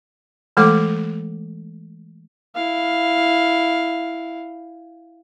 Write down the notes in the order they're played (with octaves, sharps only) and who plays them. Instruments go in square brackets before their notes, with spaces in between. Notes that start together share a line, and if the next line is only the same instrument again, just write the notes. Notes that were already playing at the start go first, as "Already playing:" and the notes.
[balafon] E3 G#3 A3 A4 D6
[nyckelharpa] E4 F5